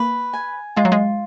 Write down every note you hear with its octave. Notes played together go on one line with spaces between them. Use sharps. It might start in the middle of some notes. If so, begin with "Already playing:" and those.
Already playing: A#3 B4
G#5
G#3 F4
F#3
G#3